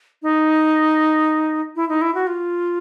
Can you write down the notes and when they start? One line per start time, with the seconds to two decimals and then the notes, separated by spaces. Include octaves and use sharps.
0.23 D#4
1.76 E4
1.89 D#4
2.01 E4
2.15 F#4
2.27 F4